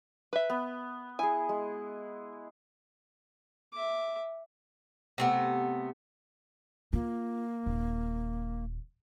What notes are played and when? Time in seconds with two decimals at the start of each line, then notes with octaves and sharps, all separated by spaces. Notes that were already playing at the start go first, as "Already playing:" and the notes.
0.33 B4 E5
0.50 B3
1.19 E4 G#4 G#5
1.49 G#3
3.73 E5 D6
5.18 C3 A3 B3
6.93 A#3 F4
7.66 D#1